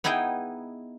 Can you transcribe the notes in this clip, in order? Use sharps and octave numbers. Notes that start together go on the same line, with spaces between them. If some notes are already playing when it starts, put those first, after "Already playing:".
B3 D#4 E4 G#4 G5